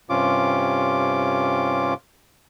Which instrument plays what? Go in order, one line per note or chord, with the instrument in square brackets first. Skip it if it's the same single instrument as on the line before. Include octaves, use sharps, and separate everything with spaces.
[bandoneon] G2 C3 C#4 F4 D6